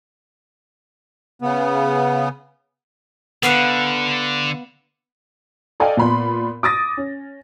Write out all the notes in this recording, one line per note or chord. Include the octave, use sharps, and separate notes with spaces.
C#3 B3
D3 B3 F5 F#5
A4 D5 D#5 F5 G5 G#5
A#2 B3 B5 C6
D6 D#6 A6 A#6
C#4